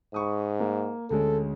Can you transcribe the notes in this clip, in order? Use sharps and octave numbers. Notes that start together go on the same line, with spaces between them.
G#2 B5 C#6 D#6
A#3
D2 G#3 C#4 A4